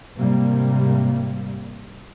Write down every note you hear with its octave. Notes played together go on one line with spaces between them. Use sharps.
G#2 C3 G3 A#3